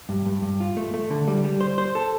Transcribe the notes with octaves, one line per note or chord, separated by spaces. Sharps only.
G2
G2
G2
F4
A3
A3
D3
G3
G3
C5
C5
A4